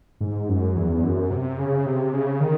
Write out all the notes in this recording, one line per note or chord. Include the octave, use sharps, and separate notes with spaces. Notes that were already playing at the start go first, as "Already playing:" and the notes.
G#2
F#2
E2
F#2
C3
C#3
C3
C#3
D#3